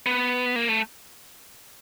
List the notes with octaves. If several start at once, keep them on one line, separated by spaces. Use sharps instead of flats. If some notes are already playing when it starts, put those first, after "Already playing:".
B3
A#3
A3